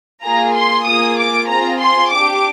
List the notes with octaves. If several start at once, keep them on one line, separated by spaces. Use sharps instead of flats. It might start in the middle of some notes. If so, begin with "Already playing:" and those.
A#3 F4 G#4 A#5
C6
A#3 F4 G#4 D#6
D6
C4 F4 G#4 A#5
C6
D4 G4 D6